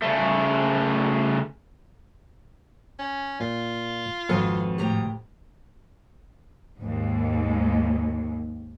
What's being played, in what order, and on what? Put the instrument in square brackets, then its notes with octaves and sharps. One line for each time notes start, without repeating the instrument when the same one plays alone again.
[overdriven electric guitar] C#3 A3
[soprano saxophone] C#4
[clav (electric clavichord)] A#2 [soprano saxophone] F4
[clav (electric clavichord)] G#1 F#4 [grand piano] F2 [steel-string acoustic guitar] A4 B4
[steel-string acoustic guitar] A2 G4 A#5
[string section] D#2 G#2